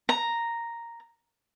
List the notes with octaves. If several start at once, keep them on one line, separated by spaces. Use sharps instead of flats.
A#5